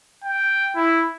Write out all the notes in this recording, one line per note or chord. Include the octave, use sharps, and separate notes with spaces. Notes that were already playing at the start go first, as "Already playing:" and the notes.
G5
E4